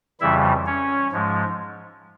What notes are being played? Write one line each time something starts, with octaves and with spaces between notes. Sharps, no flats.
F2 C#3 E3 G3 E4 E5
C#4 C#5
G#2 F3 G#3